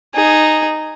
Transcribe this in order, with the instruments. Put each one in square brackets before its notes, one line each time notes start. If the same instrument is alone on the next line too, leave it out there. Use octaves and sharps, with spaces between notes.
[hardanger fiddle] D#4 G#4